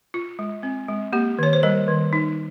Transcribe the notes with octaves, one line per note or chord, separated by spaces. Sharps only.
F4
G#3
C4
G#3
A#3 G4
D#3 C#5
C5
G3 A#4
D#3
D#4